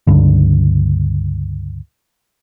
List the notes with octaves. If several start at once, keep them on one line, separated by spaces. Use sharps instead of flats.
C#2 G2 D3